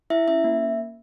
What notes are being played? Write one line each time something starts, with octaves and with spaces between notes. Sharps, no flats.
E4 E5
C#4 E5
A#3